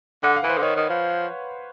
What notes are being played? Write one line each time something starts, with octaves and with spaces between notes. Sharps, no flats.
D3 F#5
F5
E3 B4
C5
D3
D#3 C#5
D#3
F3